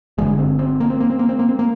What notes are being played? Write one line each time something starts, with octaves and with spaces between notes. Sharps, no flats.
G1 G2 D3 G#3
C4
C4
A#3
C4
A#3
C4
A#3
C4
A#3
C4
A#3